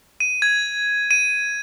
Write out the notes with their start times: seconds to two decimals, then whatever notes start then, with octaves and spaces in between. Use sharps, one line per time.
0.20 D#7
0.42 G#6
1.11 D#7